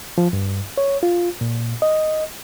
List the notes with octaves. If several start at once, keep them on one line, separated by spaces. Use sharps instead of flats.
F3
G2
C#5
F4
A#2
D#5